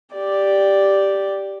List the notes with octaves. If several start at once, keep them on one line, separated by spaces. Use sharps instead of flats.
G4 D5